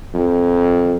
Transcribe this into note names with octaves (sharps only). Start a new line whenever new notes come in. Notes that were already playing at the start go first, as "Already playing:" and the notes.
F2